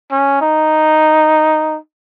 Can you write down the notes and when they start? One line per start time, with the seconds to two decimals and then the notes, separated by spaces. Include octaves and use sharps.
0.12 C#4
0.41 D#4